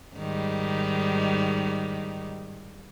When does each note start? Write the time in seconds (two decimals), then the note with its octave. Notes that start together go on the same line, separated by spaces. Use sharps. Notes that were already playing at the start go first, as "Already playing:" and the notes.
0.15 G#2 D#3 G3